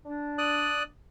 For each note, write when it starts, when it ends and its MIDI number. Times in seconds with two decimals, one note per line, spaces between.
0.06 0.86 62
0.38 0.83 74
0.38 0.83 87
0.38 0.83 90